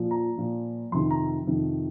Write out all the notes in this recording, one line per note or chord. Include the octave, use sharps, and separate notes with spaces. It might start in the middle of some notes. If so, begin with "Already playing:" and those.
Already playing: A#2 F3
A#5
A#2 F3
F2 C3 D#3 C6
A#5
F2 C3 D#3